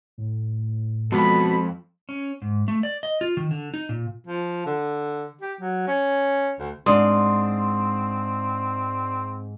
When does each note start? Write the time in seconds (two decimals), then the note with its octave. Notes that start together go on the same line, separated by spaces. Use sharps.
0.18 A2
1.12 F2 B2 G#3 A4 A5 B5
2.09 C#4
2.42 G#2
2.68 A3
2.83 D5
3.03 D#5
3.21 F4
3.37 D#3
3.51 D3
3.74 D#4
3.89 A#2
4.27 F3
4.66 D3
5.41 G4
5.61 F#3
5.87 C#4
6.59 D2
6.86 G#2 C4 D4 C6 D#6